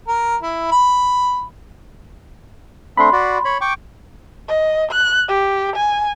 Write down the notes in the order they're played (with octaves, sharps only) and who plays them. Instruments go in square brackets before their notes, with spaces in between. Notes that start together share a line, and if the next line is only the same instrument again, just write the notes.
[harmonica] A#4
E4
B5
[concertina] A3 C4 D4 [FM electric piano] B5 C6
[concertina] F#4 D5
C#5 B5
G5 C#6 D6
[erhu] D#5
F#6
G4
G#5